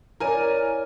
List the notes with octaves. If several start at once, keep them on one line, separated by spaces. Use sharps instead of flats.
E4 A#4 C#5 D5 G#5